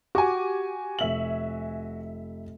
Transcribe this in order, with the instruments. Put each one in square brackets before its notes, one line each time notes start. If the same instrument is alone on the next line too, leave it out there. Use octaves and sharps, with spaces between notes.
[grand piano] F#4 G#5 [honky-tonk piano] G4 D6
[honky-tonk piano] F1 E5 F#7